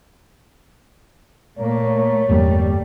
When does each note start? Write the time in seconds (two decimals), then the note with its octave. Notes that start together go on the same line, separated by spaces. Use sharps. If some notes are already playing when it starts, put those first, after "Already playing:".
1.58 A#2 A3 A#3 C#5
2.29 G1 E2 G3 A#3